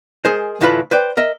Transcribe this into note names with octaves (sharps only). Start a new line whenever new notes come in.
G#3 G#4 A#4 C5
D2 A2 E3 F4 B4 B5
B4 C5 D5 G5
A#4 D#5 E5